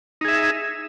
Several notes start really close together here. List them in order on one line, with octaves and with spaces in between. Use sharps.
D#4 G#4 E5